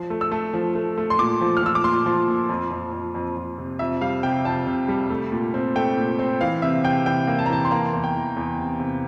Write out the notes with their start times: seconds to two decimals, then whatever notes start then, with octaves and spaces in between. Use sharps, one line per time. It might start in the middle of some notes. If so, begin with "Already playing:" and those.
Already playing: F3
0.10 A3
0.21 E6
0.32 A3
0.53 F3
0.75 A3
0.98 A3
1.10 C6
1.19 A#2 D6
1.41 F3
1.57 F6
1.62 F3 E6
1.75 D6
1.84 A#2 C6
2.06 F3
2.28 A#2
2.49 F2
2.71 F2
2.93 F2
3.15 F2
3.36 F2
3.58 C3
3.79 F2 E5
4.01 G3 F5
4.23 C3 G5
4.45 F2 A5
4.67 C3
4.88 G3
5.10 A3
5.32 A#2
5.54 C4
5.75 A3 G5
5.97 A#2
6.19 C4
6.41 E3 F5
6.62 C3 E5
6.84 C3 G5
7.06 E3 G5
7.27 A#3
7.39 A5
7.46 A#5
7.49 E3 A5
7.65 C6
7.71 A#3 A#5
7.93 E2
8.04 G5
8.14 E2
8.36 E2
8.58 C3
8.80 C3